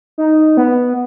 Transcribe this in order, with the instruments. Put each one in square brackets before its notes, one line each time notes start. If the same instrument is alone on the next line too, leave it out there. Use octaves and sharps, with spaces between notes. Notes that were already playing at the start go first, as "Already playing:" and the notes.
[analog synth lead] D#4
B3